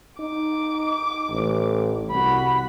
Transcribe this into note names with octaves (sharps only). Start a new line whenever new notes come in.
D#4 D6
A1
C2 F#4 B5